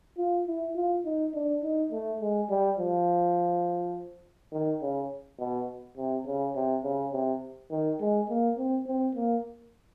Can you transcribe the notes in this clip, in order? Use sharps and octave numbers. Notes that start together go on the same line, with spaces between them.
F4
E4
F4
D#4
D4
D#4
A3
G#3
G3
F3
D#3
C#3
B2
C3
C#3
C3
C#3
C3
D#3
G#3
A#3
C4
C4
A#3